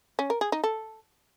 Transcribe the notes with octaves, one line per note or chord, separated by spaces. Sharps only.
C#4
A#4
G#4
D#4
A4